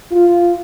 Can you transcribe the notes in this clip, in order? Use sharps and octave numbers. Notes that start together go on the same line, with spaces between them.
F4